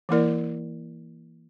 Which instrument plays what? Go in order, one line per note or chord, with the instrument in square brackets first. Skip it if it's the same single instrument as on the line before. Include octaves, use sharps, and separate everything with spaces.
[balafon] E3 A#3 E4 A#4 D5